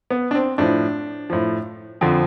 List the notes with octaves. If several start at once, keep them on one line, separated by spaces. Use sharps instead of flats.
B3
D4
C4
A2 F3 D4
A2 F3
F2 D3 F3 C4